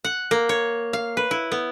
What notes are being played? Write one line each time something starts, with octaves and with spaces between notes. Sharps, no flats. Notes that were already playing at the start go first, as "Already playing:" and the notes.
F#5
A#3
C#5
F5
B4
E4
B3